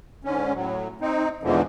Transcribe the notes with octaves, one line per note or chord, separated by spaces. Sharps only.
G#2 D3 C#4
A2 F#3
C4 D#4
E2 G#2 B2 D3 E3 F3